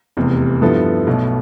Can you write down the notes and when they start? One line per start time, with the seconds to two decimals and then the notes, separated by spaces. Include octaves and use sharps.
0.17 F1 E2 C3
0.62 G2 F3 B3 E4 A4
1.07 B1 B2 A3